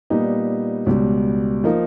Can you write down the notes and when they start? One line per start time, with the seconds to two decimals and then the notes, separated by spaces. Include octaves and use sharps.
0.10 A#2 G3 B3 D#4
0.86 C#2 B2 G3
1.64 F3 A#3 D#4